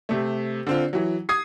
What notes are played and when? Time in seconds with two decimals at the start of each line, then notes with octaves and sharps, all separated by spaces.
0.09 C3 A3
0.67 D3 C4 F4
0.93 E3 F#3
1.29 D#6 G#6 C7